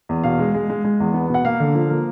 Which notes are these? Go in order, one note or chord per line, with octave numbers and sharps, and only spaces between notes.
E2
B2 F5
G#3
G#3
G#3
G#3
E2
B3
B2 F#5
A#3 F5
D3
F3
A#3